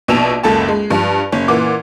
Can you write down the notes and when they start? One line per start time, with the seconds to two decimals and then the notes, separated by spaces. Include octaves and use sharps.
0.08 A#1 B2 A5 E6 E7 F7
0.43 F#1 C#2 A4 A5
0.68 G#3
0.90 G2 F3
1.32 F#1 C#4
1.48 A#2 E3 F#5 D6